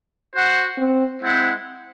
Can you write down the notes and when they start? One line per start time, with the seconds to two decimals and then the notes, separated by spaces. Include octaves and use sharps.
0.33 F#4 C5 F#5
0.78 C4
1.21 G#3 C4 E4 C5 F#5